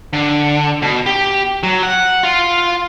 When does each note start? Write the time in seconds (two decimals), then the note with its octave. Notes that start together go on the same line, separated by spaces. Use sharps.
0.13 D3
0.82 B2
1.06 G4
1.63 F#3
1.83 F#5
2.23 F4